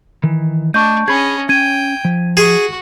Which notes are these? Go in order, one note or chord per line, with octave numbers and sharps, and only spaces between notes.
D#3 E3
A3 D4 D#5 C#6 G6
C#4 G#4 D#5 B5 G#6
C#4 G5 G#6 D#7
F3
F#4 G#4